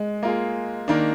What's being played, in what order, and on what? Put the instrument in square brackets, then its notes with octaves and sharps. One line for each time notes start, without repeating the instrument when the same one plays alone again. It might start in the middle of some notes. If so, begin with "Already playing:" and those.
Already playing: [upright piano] G#3
[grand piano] A#3 F4 G#4
D#3 A#3 D4